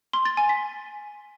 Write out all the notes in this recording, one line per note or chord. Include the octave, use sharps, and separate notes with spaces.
C6
A6
G#5
B6